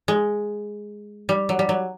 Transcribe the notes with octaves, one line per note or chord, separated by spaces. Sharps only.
G#3
G3
F#3
G3
F#3